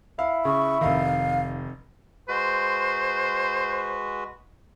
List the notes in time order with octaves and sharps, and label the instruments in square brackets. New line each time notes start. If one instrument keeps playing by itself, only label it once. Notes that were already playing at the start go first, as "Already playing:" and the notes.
[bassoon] E4 [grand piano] F5
[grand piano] C#3 [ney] C#6
[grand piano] F1 D#3 [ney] F5
[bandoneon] G#3 F#4 B4 [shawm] C5